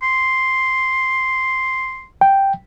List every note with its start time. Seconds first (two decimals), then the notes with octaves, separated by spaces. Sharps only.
0.03 C6
2.21 G5